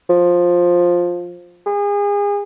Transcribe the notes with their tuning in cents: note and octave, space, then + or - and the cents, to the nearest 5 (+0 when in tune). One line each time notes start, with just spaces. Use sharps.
F3 +10
G#4 -35